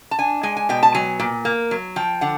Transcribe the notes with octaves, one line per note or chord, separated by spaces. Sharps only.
A5
D4 G#5
G#3 G#5
G#5
B2 G5
A5
F#3 G#5
A#2
A#3
F#3
F3 G5
D3 F#5